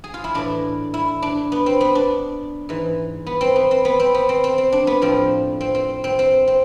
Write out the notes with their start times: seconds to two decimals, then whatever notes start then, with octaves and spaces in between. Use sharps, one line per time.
0.04 G#4
0.14 F4
0.24 E4
0.34 A2 E3 D4
0.94 E4
1.22 D4
1.52 B3
1.66 C4
1.81 B3
1.95 D4
2.69 G#2 E3
3.26 B3
3.41 C4
3.56 B3
3.71 C4
3.85 B3
4.00 C4
4.14 B3
4.29 C4
4.44 C4
4.58 C4
4.72 D4
4.87 B3
5.02 A2 F3 C4
5.61 C4
5.75 C4
6.04 C4
6.19 C4
6.47 C4